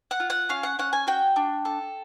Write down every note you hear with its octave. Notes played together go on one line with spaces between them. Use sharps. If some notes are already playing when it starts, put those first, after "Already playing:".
F#5
F4
F#5
C#4 F5
F#5
C#4 F#5
G#5
F#4 G5
D4
A4